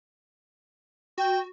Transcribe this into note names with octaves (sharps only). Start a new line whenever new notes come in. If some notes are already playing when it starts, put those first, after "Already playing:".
F#4 G5